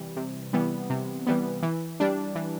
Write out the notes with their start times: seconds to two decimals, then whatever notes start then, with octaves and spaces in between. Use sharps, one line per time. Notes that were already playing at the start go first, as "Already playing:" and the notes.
Already playing: C3 E3 G3
0.16 C3
0.53 E3 G3 B3
0.90 C3
1.27 E3 G3 B3
1.63 E3
2.00 G3 D4
2.35 E3